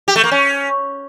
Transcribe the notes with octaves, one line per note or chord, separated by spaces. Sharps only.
G4
A3
A#3
C#4